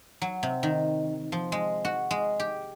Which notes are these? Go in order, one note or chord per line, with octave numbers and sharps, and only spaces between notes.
F#3
C3
D#3
F3
G#3
F#4
G#3
G4